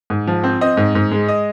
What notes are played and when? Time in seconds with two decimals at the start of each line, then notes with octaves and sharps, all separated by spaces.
0.10 G#2
0.27 F3
0.44 C4
0.61 C4 D#5
0.77 G#2
0.95 G#2
1.12 G#3
1.28 D#5